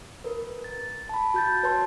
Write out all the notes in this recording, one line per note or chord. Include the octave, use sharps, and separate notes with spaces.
A#4 B4
A6
A5 B5
F#4 G6 A6
B4 C#5 A5 C6